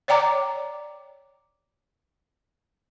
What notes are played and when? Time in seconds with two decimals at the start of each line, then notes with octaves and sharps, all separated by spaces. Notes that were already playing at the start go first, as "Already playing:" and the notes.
0.08 C#5 D5 G5 A#5 D6